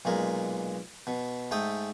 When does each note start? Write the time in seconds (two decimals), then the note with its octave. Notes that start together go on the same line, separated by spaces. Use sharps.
0.05 B1 A#2 G#3 A#4
1.07 B2
1.51 G#2 A3 G5 D#6